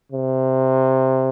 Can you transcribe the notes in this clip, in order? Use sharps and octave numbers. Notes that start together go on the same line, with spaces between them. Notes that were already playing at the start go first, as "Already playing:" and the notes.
C3